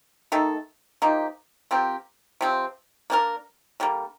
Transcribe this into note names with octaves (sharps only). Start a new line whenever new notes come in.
D#3 A3 D#4 A4
F3 A#3 D#4 G4
F3 C4 G4 A#4
C3 F3 C4
A#3 D4 G4 A#4
D3 G3 A#3